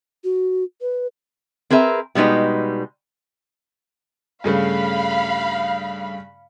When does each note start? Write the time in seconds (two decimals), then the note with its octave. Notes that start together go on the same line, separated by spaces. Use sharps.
0.24 F#4
0.81 B4
1.70 C4 G#4 A#4 B4 E5
2.15 B2 G3 G#3 D#4 B4
4.44 G2 C#3 A3 F5 B5